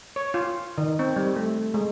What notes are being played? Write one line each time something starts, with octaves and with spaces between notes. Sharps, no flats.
C#5
F4
D#3
C4
G3
A3
G#3